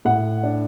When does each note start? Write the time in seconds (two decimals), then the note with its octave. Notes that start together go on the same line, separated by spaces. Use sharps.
0.05 A2 F#5
0.43 D4